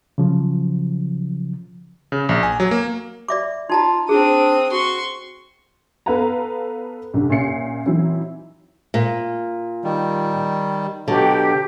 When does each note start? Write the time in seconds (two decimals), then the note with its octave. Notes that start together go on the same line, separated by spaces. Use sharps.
0.18 C#3 F3 F#3
2.12 C#3
2.29 A#1
2.43 G#5
2.60 F#3
2.71 A#3
3.28 D5 E5 D6
3.70 D#4 F4 A5 A#5
4.09 C4 D4 G#4 D#6
4.72 F#4 C6 C#6
6.06 B3 A4 B4 F5 F#5 A#5
7.14 C2 F#2 D3
7.30 A#2 C#4 E5 C7 C#7
7.86 E3 F#3 C4 D#4 E4
8.94 A#2
9.84 D#3 G3
11.08 B2 D3 F#3 G4